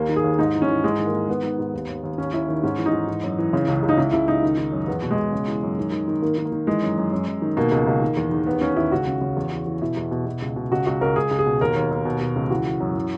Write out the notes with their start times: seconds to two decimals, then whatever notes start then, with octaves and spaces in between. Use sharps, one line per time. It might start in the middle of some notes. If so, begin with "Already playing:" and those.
Already playing: D#2 A#3
0.09 D#3
0.16 G#4
0.24 D#2
0.39 G#2 D#4
0.54 E3
0.62 C#4
0.69 E3
0.84 G#2 G#3
0.98 D#3
1.06 A#3
1.13 D#3
1.28 G#2 B3
1.43 D#3
1.59 G#2
1.73 D#2
1.89 D#2
2.03 D#2
2.18 D#2 C#4
2.33 D#2 E4
2.48 D#3
2.63 G#2 C#4
2.78 E3
2.86 D#4
2.93 G#2
3.08 E3
3.23 F#2
3.38 E3
3.53 C#3
3.68 C#2
3.83 C#2
3.89 D#4
3.97 C#2 E4
4.13 C#2 E4
4.28 C#2 D#4
4.43 D#3
4.58 D#3
4.72 F#2
4.87 E2 B3
5.02 B2
5.10 G#3
5.17 B2
5.32 C#3
5.48 E3
5.63 F#2
5.77 D#3
5.92 D#3
6.08 D#3
6.22 D#3 A#3
6.38 D#3
6.45 A#3
6.52 D#3
6.67 E3 G#3
6.83 F#2
6.97 F#2
7.12 F#2
7.27 F#2
7.42 D#3
7.57 B2 A#3
7.72 C#2
7.87 C#2
8.02 D#3
8.17 E2
8.32 D#3
8.46 D#2 B3
8.61 D#2 C#4
8.76 D#3 E4
8.92 C#2 F#4
9.07 C#3
9.21 C#3
9.36 E2
9.51 E3
9.66 E3
9.81 B2 E4
9.97 E2
10.11 B2
10.26 B2
10.42 C#2
10.56 B2
10.71 C#2 F#4
10.87 C#2 F#4
11.01 C#2 A#4
11.16 C#2 G#4
11.31 C#2
11.39 G#4
11.46 B2
11.61 D#2 A#4
11.76 D#2
11.91 D#2
12.05 B2
12.21 B2
12.36 C#2
12.50 E3 F#4
12.66 E3
12.80 F#2
12.96 E3